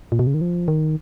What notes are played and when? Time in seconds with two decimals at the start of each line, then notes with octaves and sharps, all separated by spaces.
0.12 A#2
0.19 B2
0.27 C#3
0.34 D#3
0.41 F3
0.68 D#3